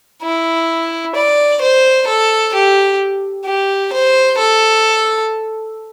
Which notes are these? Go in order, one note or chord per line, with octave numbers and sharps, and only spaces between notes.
E4
D5
C5
A4
G4
G4
C5
A4